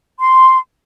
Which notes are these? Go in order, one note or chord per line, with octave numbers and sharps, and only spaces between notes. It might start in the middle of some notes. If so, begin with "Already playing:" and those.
C6